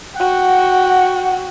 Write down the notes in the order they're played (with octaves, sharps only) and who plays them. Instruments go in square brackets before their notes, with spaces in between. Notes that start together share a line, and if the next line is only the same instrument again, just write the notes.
[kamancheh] F#4 G5 [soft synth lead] F#5